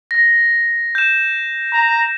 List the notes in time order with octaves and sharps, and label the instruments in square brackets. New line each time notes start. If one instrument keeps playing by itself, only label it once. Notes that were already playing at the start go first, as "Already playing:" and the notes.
[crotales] A#6
G6 E7
[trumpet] A#5